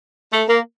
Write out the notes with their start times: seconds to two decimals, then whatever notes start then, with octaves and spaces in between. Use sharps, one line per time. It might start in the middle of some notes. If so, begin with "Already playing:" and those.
0.33 A3
0.48 A#3